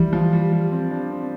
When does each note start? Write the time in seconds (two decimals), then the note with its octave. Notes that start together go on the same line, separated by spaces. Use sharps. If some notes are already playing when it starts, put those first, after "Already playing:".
Already playing: E3 G3
0.13 F3
0.33 G3
0.52 G3
0.72 C4
0.91 D4
1.10 C4